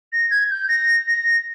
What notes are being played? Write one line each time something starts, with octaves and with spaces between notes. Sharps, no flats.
A#6
G#6
G6
A#6
A#6